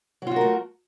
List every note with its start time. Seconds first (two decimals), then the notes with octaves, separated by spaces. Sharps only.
0.22 F#3
0.27 F4
0.31 F#4
0.36 A#4
0.41 A3